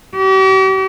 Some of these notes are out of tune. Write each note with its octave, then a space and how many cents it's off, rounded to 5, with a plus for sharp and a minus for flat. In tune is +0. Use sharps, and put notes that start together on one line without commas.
G4 -45